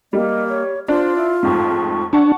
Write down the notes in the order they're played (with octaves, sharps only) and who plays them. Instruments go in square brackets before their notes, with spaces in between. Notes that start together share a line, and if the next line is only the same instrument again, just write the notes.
[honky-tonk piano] G3 [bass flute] A#3 [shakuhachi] D#5
[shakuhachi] C#5
[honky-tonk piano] D4 [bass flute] F4 [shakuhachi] C5
[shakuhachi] E4
[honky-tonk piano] A1 F2 G#2 [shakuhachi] C#6
[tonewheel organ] D4 [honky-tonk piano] F#5 A5 C#6